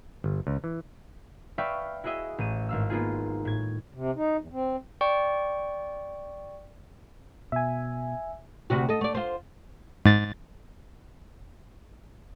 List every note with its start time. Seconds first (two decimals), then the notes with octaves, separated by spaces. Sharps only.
0.24 G1
0.47 C#2
0.64 E3
1.58 B4 D5 E5 F5 G5 C#6
2.04 E4 F#4 G#4 D#5 E5
2.38 A1 D#7
2.69 G#1 F5 E6
2.90 A#3 B3 D#4 F4 G#4
3.45 A2 G#6
3.94 C3
4.16 D#4
4.40 E2
4.52 C4
5.01 D5 G5 C#6
7.52 B2 E5 G#5
8.70 D2 C3 F#4
8.89 A4 D#5
9.01 A3 D5
9.15 F4 C5
10.06 G#2 A6